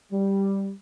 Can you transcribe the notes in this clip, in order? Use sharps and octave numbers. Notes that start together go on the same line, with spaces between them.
G3